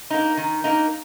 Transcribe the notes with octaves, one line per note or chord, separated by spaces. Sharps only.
A#3 D#4
D#3
A#3 D#4